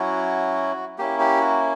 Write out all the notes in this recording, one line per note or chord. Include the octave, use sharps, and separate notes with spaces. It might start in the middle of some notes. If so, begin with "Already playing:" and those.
Already playing: F#3 C#4 E4 F#4
A#3 C#4 E4 G4
G4
F#4